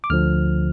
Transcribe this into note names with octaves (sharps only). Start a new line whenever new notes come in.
D6
D2 D3 F3 F6